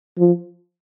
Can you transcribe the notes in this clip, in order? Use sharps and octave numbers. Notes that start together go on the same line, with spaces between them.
F3